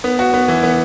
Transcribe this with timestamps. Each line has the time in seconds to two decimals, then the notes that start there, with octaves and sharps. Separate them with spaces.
0.04 B3
0.19 F#4
0.34 B3
0.48 E3
0.63 B3